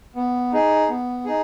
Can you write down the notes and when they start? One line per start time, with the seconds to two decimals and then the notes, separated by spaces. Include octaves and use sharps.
0.16 B3
0.53 D#4 G#4
0.89 B3
1.25 D#4 G#4